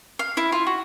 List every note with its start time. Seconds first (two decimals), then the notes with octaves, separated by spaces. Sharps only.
0.19 F5
0.37 E4
0.52 F4
0.66 F#4